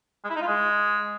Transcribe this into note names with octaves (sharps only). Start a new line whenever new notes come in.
G#3
E4
D#4
F4
G#3